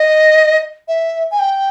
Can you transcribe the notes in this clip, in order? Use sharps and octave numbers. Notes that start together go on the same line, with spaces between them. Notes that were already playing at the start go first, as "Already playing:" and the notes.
Already playing: D#5
E5
G#5
G5